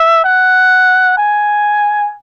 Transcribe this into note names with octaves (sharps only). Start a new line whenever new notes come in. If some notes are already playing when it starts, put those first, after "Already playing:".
Already playing: E5
F#5
G#5